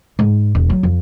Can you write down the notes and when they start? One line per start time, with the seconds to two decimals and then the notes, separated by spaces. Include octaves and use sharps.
0.19 G#2
0.55 E1
0.70 F#3
0.83 F2